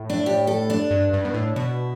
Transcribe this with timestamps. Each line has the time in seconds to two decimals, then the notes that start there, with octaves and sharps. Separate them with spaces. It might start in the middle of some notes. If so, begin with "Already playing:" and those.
Already playing: A2
0.10 D4
0.26 G4
0.47 A4
0.70 D4
0.91 G2
1.13 G2
1.25 B2
1.34 A2
1.56 B2 E4